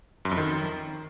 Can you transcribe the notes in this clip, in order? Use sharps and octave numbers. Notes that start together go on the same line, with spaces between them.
F#2
F2
D#3